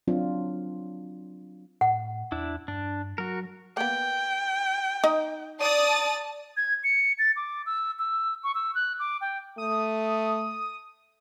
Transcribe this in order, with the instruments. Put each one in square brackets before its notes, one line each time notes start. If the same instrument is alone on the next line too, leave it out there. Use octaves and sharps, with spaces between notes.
[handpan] F#3 C4 D4 F4
[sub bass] A2 [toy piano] F#5
[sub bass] E2 [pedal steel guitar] D4 E4
[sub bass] G2 [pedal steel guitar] D4
[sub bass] F#3 [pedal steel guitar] F#4 A#4
[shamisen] A#3 B3 [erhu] G5
[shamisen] D#4 D#5
[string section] D5 D#6 A6 [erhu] A5
[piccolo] G#6
C#7
A6
D6
E6
E6
C#6
E6
F#6
D6
G5
[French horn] A3 [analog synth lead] D#6